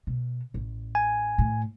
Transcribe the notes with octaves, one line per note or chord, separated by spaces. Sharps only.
B2
A1
G#5
A2